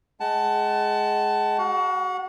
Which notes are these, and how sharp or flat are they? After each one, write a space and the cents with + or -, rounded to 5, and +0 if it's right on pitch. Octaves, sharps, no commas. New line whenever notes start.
G#3 +10 F#5 +30 A5 +0
F#4 +25 F#5 -30